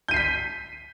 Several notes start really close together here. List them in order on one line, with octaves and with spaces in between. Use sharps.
G6 D#7 C7 B6